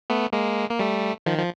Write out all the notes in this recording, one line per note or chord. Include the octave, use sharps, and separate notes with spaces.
A3 B3
G#3 A#3
A#3
G3 A3
D#3 F3
F3